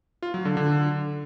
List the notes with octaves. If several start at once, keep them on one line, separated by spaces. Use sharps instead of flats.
F4
F#3
D3
D3